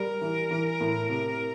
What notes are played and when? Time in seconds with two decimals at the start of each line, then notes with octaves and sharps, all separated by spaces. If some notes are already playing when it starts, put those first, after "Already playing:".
Already playing: G3 A#4
0.21 E3
0.51 E3
0.81 A2
1.09 C3